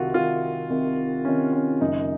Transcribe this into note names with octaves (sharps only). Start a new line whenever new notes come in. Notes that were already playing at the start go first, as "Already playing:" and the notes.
Already playing: C2 C3 D#3 F4 F#4
C2 C3 D#3 F4
C2 C3 D#3
C2 C3 D#3 C#4
C#4
F#1 F#2 D#3 D#4